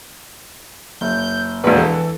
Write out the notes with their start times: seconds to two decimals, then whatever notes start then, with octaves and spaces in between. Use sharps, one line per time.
1.01 F#1 G6
1.64 E1 A#1 B4
1.76 E3 A4